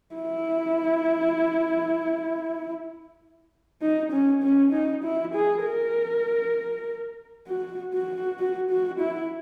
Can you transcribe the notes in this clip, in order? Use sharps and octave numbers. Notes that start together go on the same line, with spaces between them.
E4
D#4
C#4
C#4
D#4
E4
G#4
A#4
F#4
F#4
F#4
F#4
E4